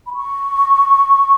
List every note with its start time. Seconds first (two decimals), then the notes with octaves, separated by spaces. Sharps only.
0.07 B5
0.14 C#6